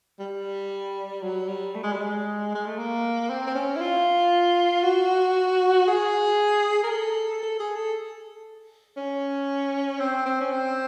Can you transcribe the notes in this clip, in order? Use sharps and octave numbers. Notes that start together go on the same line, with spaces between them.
G3
F#3
G3
A3
G#3
G3
G#3
G#3
A3
A#3
C4
C4
C#4
E4
F4
F#4
G#4
A#4
A4
A4
G#4
A4
C#4
C4
C4
C#4
C4